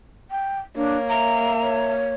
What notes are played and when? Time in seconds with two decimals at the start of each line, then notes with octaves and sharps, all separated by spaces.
0.31 G5
0.76 A#3 D4 C#5
1.10 E5 A#5
1.62 C#5